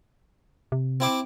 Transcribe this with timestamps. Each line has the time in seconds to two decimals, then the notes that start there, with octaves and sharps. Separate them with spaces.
0.72 C3
1.00 C4 E4 D6